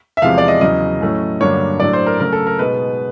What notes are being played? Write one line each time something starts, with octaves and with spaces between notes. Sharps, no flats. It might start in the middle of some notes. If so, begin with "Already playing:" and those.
E5
E2 C3 F3 G#3 F5
D5
D#5
E2 C#3 F#3 D#5
A2 F#3 A3 C#4
G2 D3 F#3 A#3 D4 C#5
A2 F#3 A3 D4 D5
C5
A#4
C#3 F#3 A3 A#4
A4
A#4
B2 G#3 B3 D#4 B4